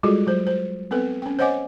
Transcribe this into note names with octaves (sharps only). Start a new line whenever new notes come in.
G3 G#3 F4 F#4 G#4 A4
F#3 C5
C5
B3 C4 A4 B4
C#4 G5
C5 C#5 D#5 F#5 G#5 D6